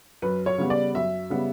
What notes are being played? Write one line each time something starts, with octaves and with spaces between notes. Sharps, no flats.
F#2 B4
C#5
C#3 G3 B3
D5
F#2 E5
C#3 G3 B3